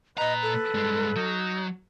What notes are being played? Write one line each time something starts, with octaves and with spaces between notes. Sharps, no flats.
A#2 B4 D#5 A#5
A4
G2 G#3
F#3 D#4